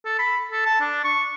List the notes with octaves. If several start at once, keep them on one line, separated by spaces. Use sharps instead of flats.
A4
B5
A4
A5
D4
C#6